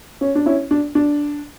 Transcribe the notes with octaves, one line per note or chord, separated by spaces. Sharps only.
C#4
D4
C#4 E4
D4
D4